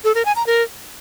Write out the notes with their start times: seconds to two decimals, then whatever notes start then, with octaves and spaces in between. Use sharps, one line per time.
0.04 A4
0.15 A#4
0.25 G#5
0.36 A#5
0.46 A#4